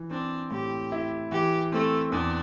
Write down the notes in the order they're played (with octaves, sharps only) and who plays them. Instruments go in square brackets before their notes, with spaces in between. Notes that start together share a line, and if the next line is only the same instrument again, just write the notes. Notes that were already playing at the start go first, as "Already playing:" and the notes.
Already playing: [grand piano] E3
[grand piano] C4 [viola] D4
[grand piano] A2 [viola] G4
[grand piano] E4
[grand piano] E3 [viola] G4
[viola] A3 [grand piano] C4
[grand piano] E2 [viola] D4